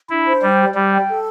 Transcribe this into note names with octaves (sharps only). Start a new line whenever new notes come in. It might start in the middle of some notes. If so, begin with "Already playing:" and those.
D4 E4
C5
G3 G5
G4
G3 G4
G5
A4